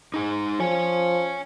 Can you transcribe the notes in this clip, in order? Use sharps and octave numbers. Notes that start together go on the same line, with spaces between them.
D#4 G#4
F3 C#5 G#5